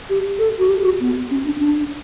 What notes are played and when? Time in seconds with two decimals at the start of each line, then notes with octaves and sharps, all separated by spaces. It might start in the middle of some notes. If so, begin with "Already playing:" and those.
0.10 G4
0.39 A4
0.59 F#4
0.69 G4
0.84 F#4
1.00 B3
1.31 C#4
1.45 D4
1.60 D4